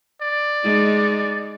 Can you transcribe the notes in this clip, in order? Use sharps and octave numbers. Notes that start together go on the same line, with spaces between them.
D5
G#3 D#4